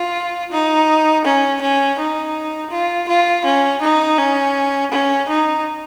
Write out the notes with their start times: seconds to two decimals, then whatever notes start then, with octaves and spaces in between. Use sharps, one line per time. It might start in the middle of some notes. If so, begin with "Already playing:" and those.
Already playing: F4
0.51 D#4
1.25 C#4
1.61 C#4
1.98 D#4
2.71 F4
3.08 F4
3.45 C#4
3.82 D#4
4.18 C#4
4.92 C#4
5.29 D#4